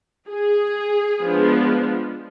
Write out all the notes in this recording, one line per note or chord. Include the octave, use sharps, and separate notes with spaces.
G#4
F3 G#3 B3 D4